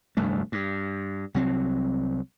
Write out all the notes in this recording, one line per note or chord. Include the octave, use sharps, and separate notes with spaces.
F1 D2 G2 A3
G2
C2 F#3 C4